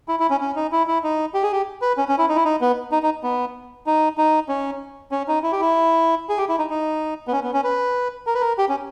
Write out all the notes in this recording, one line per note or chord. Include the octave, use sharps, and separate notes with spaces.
E4
E4
C#4
C#4
D#4
E4
E4
D#4
G4
G#4
G4
B4
C#4
C#4
E4
D#4
E4
D#4
B3
D#4
D#4
B3
D#4
D#4
C#4
C#4
D#4
E4
G4
E4
G#4
G4
E4
D#4
D#4
B3
C#4
B3
C#4
B4
A#4
B4
A#4
G4
C#4